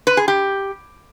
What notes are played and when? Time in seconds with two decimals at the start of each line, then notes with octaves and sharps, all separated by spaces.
0.07 B4
0.17 G#4
0.28 G4